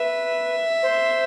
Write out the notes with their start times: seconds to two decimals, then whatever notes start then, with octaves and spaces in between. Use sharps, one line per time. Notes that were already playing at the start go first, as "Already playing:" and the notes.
Already playing: B4 E5
0.83 C5